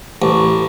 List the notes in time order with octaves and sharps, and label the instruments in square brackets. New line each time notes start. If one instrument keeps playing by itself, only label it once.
[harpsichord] A1